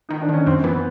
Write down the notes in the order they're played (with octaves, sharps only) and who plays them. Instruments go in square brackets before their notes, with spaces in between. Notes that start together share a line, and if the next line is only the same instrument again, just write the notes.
[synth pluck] D#3 [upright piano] D#4
[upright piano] D4
[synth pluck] D#3 [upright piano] C#4
[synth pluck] F#2 [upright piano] C4
[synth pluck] E3 [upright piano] B3